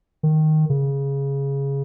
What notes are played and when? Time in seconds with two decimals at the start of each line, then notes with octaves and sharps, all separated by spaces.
0.23 D#3
0.70 C#3